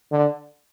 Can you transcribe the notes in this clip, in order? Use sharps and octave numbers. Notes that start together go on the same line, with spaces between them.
D3